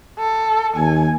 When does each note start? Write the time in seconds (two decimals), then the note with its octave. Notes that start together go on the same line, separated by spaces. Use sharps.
0.18 A4
0.76 D#2 G#5